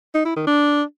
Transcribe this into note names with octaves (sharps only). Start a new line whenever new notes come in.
D#4
E4
D#3
D4